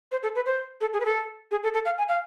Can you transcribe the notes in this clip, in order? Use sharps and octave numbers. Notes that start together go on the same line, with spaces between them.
C5
A4
B4
C5
A4
G#4
B4
A4
G#4
A4
A4
F5
G#5
F5